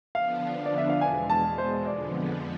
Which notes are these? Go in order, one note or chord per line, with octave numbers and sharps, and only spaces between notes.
D3 F3 B3 D4 F5
D5
E5
F5
E2 B2 G#3 G#5
A5
C5
F2 D3 F3 G#3 B3 D5